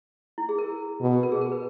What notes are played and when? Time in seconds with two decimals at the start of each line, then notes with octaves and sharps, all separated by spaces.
0.38 E4
0.49 G#4
0.58 A#4
1.01 B2
1.23 A#4
1.32 G#4
1.41 A#4
1.52 B4